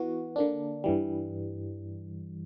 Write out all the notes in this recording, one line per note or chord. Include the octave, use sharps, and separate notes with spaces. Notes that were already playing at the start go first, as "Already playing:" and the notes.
Already playing: E3 B3 F#4
D3 A#3 D4
G2 E3 G3